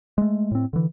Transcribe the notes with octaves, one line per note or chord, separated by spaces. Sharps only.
G#3 A3
A2 C4
D3 E3